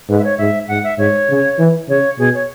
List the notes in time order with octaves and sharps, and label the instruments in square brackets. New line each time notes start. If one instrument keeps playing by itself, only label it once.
[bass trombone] G#2 [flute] B4
[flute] E5
C#5
[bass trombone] G#2 [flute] E5
[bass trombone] G#2 [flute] F#5
[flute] E5
[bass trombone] G#2 [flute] C#5
[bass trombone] C#3
E3
[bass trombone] C#3 [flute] C#5
[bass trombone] B2 [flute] G#4
[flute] C#5